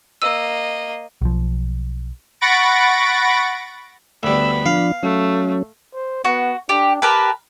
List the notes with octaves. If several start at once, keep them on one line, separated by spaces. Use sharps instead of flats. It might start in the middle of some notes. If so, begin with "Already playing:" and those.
A#3 D#5 E6 D#7
B1 F3
F#5 B5 C#6 A6 A#6 D7
D2 G3 B3 B5 E6
F3 D4 F5
F#3 A3 C#4
C5
B3 F#4
D4 G4
G4 A#4 B4 A5